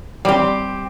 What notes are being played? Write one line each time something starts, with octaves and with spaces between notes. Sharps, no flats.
G3 C4 G4